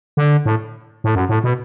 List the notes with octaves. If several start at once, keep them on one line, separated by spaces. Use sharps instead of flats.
D3
A2
A2
F#2
A2
B2